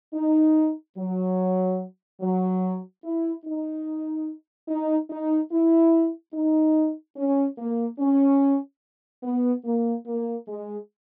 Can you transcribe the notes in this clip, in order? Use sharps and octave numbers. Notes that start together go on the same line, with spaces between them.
D#4
F#3
F#3
E4
D#4
D#4
D#4
E4
D#4
C#4
A#3
C#4
B3
A#3
A#3
G#3